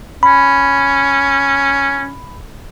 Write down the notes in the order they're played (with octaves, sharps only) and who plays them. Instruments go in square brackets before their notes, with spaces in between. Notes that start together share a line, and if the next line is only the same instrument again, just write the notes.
[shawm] C#4 [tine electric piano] B5